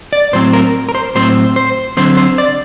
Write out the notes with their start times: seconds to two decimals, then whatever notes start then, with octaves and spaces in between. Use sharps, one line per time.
0.13 D5
0.33 A2 F#3 C4 C5
0.53 A#4
0.89 A#4
0.95 C5
1.15 A2 F#3 C4 C5
1.56 C5
1.97 D3 F#3 C4 C5
2.17 C5
2.38 D5